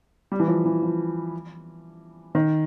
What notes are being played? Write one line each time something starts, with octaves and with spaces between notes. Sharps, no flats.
G3
E3
F3
E3
F3
D#3